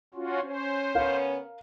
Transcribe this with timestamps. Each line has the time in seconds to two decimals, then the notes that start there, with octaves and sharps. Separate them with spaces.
0.14 C#4 F4 F#4
0.43 C#4 C5
0.95 C#3 B3 C#4 A#4 F5